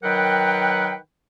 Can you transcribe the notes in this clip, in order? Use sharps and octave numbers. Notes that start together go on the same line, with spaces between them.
D#3 F#3 A#4 B4 F#5 G5